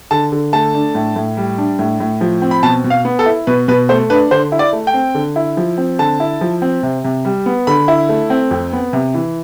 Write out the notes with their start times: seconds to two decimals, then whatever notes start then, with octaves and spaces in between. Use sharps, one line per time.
0.11 D3 A5
0.32 D3
0.53 A3 A5
0.74 D4
0.95 A2
1.16 A2
1.37 G3
1.58 D4
1.79 A2
2.00 A2
2.21 F3
2.42 C4
2.51 B5
2.63 B2 A5
2.84 B2
2.90 F5
3.05 B3
3.19 A4
3.26 E4
3.47 B2 B4
3.68 B2 B4
3.89 A3 C5
4.10 D4 B4
4.31 D3 C5
4.52 E4
4.59 D5
4.73 A3
4.87 G5
4.94 C4
5.15 D3
5.36 E4
5.57 F3
5.78 C4
5.99 D3 A5
6.20 E4
6.41 F3
6.62 C4
6.83 C3
7.04 C3
7.25 G3
7.46 B3
7.67 D3 B5
7.88 E4
8.09 A3
8.30 C4
8.51 F2
8.73 B3
8.93 C3
9.14 E3